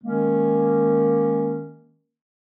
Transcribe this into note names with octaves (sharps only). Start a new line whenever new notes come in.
D#3 G#3 A#3 C#4